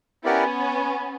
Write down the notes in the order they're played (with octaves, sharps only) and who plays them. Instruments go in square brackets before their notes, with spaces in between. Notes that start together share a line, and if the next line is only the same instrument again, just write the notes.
[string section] B3 C#4 [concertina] E4 G4 A#4 D5 F#5